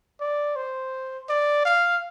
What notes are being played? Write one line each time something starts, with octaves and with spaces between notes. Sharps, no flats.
D5
C5
D5
F5